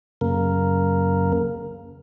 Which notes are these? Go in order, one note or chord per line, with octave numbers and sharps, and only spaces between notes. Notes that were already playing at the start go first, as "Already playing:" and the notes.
F#2 C#3 A#3 A#4